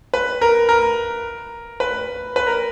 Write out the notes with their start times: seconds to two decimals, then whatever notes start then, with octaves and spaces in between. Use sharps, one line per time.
0.14 B4
0.41 A#4
0.69 A#4
1.80 B4
2.36 B4
2.47 A#4